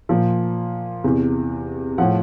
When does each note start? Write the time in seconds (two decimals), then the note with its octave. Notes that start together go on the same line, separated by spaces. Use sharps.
0.09 A#2 F3
1.04 E2 C3 E3
1.98 A2 F3 F#5